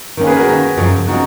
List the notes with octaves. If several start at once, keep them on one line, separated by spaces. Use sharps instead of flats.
D#3 A#3 C#4
G#4 B4
F#4 A#4
D#3 A#3 C#4
F#2 C#3 F3
C#3 F3 D#4 F#4